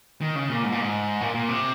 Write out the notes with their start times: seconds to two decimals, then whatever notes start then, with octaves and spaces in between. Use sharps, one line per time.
0.21 D#3
0.35 C#3
0.49 A#2
0.64 G#2
0.72 A#2
0.80 G#2
1.21 A#2
1.35 A#2
1.49 C3